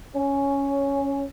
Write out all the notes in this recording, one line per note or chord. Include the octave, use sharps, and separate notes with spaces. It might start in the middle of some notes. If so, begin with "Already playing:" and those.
C#4